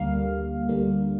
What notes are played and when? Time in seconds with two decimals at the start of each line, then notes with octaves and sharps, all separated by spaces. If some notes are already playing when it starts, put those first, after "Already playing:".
Already playing: D2 D3 G3 A#3 F5
0.69 D2 D3 G3 A#3